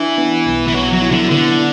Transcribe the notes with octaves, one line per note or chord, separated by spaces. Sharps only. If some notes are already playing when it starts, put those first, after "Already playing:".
Already playing: E3 D4
B3
B1
E3
F#3 B3
F#3
E4
D3
D3 B3